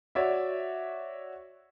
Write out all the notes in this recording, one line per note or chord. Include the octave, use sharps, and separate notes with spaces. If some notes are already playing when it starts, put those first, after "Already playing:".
F#4 C#5 D5 E5